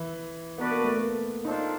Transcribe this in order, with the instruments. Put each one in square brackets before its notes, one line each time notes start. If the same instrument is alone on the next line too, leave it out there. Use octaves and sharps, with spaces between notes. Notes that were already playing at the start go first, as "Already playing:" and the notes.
Already playing: [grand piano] E3
[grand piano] B3 [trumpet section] D4 F#4 B4 D5
[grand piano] A#3
A3
A#3
[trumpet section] A#3 D4 F4 A4 C5 [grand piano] D#4